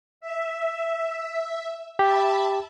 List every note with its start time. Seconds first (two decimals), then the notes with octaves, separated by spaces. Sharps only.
0.21 E5
1.99 G4 E5 A5 B5